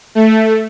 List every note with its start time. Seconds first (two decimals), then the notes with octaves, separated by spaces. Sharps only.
0.15 A3